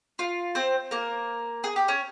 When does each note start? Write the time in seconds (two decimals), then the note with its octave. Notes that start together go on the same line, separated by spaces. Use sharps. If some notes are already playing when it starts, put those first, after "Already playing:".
0.19 F4
0.55 C4 C5
0.91 A#3 A#4
1.64 G#4
1.76 G4
1.88 C#4 C#5